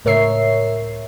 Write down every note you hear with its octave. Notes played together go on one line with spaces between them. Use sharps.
C#2 A2 A#4 C#5 E5 C7